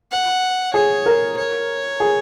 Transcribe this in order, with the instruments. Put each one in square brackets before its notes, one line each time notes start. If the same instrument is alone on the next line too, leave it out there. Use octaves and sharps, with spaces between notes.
[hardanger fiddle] F#5
[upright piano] G#4 [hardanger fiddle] C#5
[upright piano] A#4
[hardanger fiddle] C#5
[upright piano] G#4